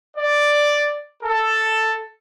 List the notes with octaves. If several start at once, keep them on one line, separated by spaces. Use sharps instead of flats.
D5
A4